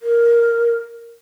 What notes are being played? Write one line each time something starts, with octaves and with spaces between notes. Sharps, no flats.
A#4